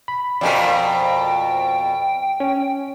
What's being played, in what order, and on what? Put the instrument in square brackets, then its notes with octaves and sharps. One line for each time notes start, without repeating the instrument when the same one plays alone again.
[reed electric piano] B5
[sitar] F2 B2 A#4 [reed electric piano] D5 D#5 G#5 [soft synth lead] G5
[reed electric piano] C#4